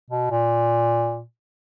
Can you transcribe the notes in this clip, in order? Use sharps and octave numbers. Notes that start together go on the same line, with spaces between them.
B2
A#2